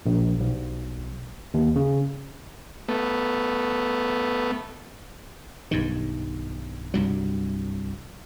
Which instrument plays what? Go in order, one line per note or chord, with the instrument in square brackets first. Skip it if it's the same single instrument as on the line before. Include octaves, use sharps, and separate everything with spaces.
[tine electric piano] A#1
B1
D#2
C#3
[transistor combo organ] A3 B3
[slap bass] B1 G2 D#3
C2 G2 F#3